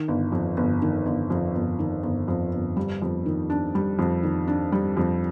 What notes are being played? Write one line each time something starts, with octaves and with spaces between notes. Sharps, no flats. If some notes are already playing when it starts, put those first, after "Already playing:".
Already playing: D#3
G1
F2
G1
D#3
G1
F2
G1
D#3
G1
F2
G1
G3
F2
D#3
D4
G3
F2
D#3
D4
G3
F2